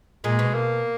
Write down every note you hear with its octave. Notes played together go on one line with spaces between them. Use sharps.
A#2 G#3
B2
A#3